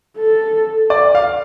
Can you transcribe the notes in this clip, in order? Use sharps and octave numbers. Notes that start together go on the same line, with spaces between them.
A4
D5
F5